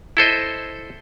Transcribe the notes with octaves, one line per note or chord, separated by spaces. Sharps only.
E4 A4 C5 D#5